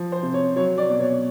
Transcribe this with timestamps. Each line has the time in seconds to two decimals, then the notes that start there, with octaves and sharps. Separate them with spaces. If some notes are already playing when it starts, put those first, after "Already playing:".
Already playing: F3
0.12 C5
0.23 C3
0.34 C#5
0.56 F#3 C#5
0.78 D5
0.90 B2
1.00 C#5